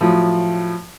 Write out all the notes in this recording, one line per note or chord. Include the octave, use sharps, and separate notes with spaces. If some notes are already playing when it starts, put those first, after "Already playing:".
A2 F3 F#3